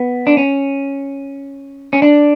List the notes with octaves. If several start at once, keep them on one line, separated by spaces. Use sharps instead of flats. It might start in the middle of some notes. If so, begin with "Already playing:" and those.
Already playing: B3
D4
C#4
C#4
D4